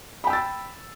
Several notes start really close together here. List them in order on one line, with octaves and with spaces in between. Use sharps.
B5 G5 E6 A6